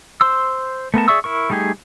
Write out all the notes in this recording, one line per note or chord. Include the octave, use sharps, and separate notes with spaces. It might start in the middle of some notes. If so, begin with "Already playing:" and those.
C5 C6 E6
A3 B3 A#4 A5
G#4 D5 E5 C#6 E6
E4 A#4 C#6
G3 A3 D#4 G4 G#4